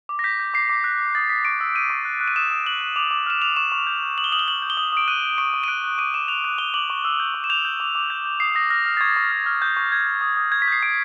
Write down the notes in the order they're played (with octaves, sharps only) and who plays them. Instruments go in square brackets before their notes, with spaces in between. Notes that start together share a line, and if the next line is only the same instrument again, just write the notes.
[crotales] D6
A#6
G6 B6
G6
D6 C7
D6
F#6 B6
F#6
D#6 A6
D#6 B6
C#6 D7
E6
G6 D#7
C#6
F#6
F#6
D#7
D#6 E7
D#6
F#6 F#7
F#6
D6 F7
D6
F6 E7
F6 F7
C#6 E7
C#6
G6
G6
D#6 F#7
G7
D#6 F#7
G7
G6 F#7
G6
G7
D#6 F#7
D#6 D7
F#6 D#7
F#6
C#6 D7
C#6
D#7
F#6 D7
F#6
D6 D#7
D6 E7
F#6 F7
F#6
D6 G7
D6 F#7
C#6
E6
G6
C#6
E7
G6 F7
G6
D6
D6
G6
G6
D#6 C7
D#6 A#6
F6 A#6
F6
A6
C#6 G#6
C#6
F6
F6
C#6 G6
C#6
G6 G#6
G6
D#6
D#6
G6 G#6
B6
G6 C7
D#6 D7